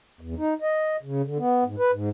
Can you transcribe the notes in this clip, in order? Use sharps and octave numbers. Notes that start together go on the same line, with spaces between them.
E2
D#4
D#5
C#3
D3
B3
G#2
B4
G#2